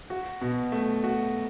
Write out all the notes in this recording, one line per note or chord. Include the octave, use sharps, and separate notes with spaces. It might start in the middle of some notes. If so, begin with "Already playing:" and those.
F#4
B2
A3
F#4